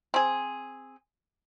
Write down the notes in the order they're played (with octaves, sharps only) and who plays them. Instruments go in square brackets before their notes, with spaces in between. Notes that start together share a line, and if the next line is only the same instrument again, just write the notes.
[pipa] C4 G#4